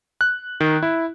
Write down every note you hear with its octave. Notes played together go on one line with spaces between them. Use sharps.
F#6
D#3
E4